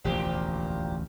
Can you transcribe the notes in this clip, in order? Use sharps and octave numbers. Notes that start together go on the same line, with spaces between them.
E1 A1 D2 A#2 F3 G4